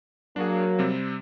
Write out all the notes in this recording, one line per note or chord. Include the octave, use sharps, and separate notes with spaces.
F#3 A#3 D4 F#4 G#4
C3 G3 C4